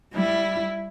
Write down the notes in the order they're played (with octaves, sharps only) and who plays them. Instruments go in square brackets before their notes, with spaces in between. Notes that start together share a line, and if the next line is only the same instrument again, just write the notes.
[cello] G3 E4